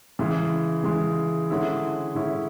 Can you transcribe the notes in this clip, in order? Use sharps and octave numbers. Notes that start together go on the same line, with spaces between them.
C#3 E3 G#3
C#3 E3 G#3
D3 G#3 C#4 E4
D3 G#3 C#4 E4